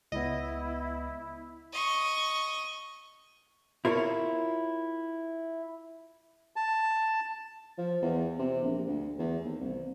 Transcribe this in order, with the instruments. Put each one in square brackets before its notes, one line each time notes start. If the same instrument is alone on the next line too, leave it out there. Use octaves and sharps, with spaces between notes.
[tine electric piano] C#2 B3 [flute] E4 [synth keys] D#5
[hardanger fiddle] D#5 C#6
[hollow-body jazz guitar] E4 F4 A#4 C#5
[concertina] A5
[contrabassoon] F3
E2
C3
A#1
D2
E2
D#2
C2